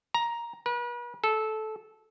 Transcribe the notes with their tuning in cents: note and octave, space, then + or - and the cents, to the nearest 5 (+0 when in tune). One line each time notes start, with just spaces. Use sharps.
A#5 +10
B4 -40
A4 -15